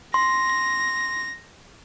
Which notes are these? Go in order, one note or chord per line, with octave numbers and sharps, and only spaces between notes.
C6 A#6